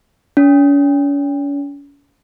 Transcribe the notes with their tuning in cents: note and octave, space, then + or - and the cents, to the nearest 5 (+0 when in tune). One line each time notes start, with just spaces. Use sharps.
C#4 +40